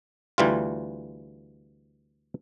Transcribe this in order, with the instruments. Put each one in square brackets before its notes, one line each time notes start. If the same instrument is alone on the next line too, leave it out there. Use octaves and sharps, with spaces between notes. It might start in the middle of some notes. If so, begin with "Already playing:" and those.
[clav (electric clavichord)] D2 E3 G3 F4